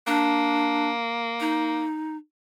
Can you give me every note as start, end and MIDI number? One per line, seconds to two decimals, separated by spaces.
0.07 1.86 58
0.07 0.90 62
1.40 2.17 63